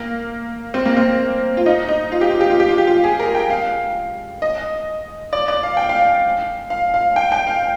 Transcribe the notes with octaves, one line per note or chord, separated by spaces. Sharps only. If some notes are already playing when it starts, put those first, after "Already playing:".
Already playing: A#3
C4
A#3
C4
F4
D#4
D#4
F4
G4
F4
G4
F4
G4
F4
G4
F4
G#4
A#4
G5
F5
D#5
D5
D5
F5
G5
F5
F5
F5
G5
G5
F5